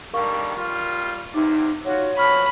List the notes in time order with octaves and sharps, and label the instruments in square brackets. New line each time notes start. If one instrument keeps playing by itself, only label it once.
[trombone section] D3 D#3 G3 [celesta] A#4 F5 C#6
[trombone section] G3 F4
[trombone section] E2 C3 [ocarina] D#4 [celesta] D6
[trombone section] F4 F#4 [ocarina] C#5
[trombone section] F2 B2 F3 [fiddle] B5 [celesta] C#6 F6